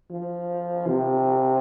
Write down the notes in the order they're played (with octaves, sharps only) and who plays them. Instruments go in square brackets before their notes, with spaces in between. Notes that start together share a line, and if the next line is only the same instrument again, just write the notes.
[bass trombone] F3
C3